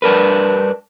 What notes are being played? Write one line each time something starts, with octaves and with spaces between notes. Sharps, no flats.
G2 D4 A#4 B4